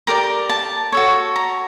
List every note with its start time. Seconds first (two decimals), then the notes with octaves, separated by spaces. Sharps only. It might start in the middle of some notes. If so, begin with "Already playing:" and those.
0.07 G4 A#4 D5 A#5
0.49 A5
0.92 F#4 A4 C#5
1.36 A#5